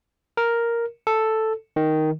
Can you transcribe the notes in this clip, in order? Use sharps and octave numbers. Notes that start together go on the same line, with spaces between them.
A#4
A4
D#3